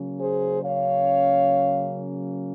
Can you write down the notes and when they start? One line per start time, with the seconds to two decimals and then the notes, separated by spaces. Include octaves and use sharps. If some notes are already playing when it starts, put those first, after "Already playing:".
Already playing: C#3 F#3 A#3 C#4
0.20 G#4 C5
0.63 C#5 F5